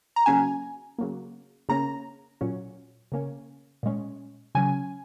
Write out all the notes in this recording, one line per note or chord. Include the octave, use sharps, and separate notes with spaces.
A#5
C#3 F#3 A#3 C#4 G#5
C#3 F#3 A#3
C#3 A#3 C#4 A#5
A#2 F#3 C#4
C#3 A#3 C#4
A#2 G#3 C#4
C#3 F#3 C#4 G#5